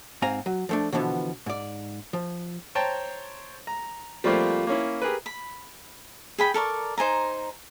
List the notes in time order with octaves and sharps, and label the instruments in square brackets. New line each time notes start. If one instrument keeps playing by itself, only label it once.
[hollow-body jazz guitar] G#2 C4 F5 G#5 A#5
F#3
F3 A3 D4
B2 D3 E3 F3 B3
G#2 D5
F3
[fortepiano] C5 C#5 G5 A5 A#5
A#5
F3 G3 A3 A#3 C4 F4
A#3 C#4 E4
G4 G#4 A#4 B4
[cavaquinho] B5
G#4 G5 B5
A4 A#4 D5 C#6
D#4 C5 G#5 A#5